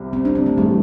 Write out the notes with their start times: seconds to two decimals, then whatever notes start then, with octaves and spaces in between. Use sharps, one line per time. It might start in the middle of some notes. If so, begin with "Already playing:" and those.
Already playing: C2 C3 G3
0.13 C4
0.25 D4
0.35 C4
0.46 A3
0.57 A1 E3 G3